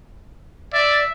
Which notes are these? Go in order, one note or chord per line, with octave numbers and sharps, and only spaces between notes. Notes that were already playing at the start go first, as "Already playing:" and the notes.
D5 E5